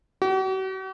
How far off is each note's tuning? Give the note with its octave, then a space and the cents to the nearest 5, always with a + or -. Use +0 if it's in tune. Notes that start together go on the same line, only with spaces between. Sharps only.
F#4 +45